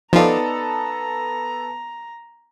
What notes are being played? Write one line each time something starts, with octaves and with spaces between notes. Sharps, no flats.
F3 B3 D#4 F4 A4 D5 A#5